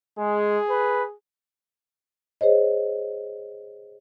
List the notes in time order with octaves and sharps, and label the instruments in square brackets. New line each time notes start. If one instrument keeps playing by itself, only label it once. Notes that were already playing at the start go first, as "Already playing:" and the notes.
[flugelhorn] G#3 [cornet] G#4
[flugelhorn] B4
[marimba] G#4 C5 C#5 D#5